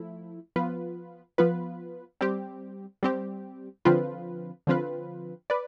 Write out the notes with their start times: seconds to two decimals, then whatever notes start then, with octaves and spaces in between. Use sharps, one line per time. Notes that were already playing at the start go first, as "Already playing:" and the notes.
Already playing: F3 A3 E4
0.56 F3 B3 F4 B4
1.38 F3 B3 F4 B4
2.21 G3 C4 G4
3.03 G3 C4 G4
3.85 D3 F3 C4 F4 B4
4.67 D3 F3 C4 F4 B4
5.50 B4 D5